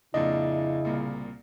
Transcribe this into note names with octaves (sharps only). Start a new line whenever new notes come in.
F2 A#2 C#3 D4 E4 D#5
C2 A#2